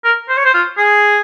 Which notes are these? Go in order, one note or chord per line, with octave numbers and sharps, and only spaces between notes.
A#4
C5
C#5
C5
F4
G#4